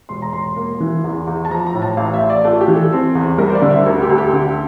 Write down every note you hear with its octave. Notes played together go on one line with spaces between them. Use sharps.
E1 C6
A#5
E1 C6
A#3
E3
E2
E2
A5
F3 A#5
A#5
A2
A5
A1 F5
E5
A1
D5
A3 F4
G4
E3
A4
C4
E2
G3 A#4
C5
D5
D3
E5
D2 A#4
G4
D2 A4
G4
D3